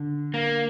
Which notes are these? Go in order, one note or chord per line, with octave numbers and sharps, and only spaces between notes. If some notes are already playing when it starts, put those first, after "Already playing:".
Already playing: D3
A#3